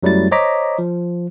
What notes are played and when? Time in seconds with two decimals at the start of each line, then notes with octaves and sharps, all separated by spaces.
0.03 F#2 F#3 G3 A3 E4 A6
0.31 C5 C#5 D#5 A#5 D6 B6
0.79 F3